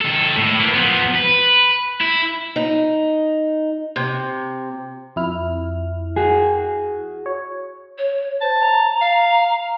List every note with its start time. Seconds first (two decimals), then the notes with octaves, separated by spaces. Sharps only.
0.02 D#3 A4
0.37 A2
0.60 A#3 B3
0.74 F3 B3
1.15 B4
2.01 E4
2.56 D#4
3.96 C3
5.16 F2 E4 F6
6.16 F#4 G#4
7.26 C#5
7.98 C#5
8.41 C5 A5
8.60 A#5
9.01 F5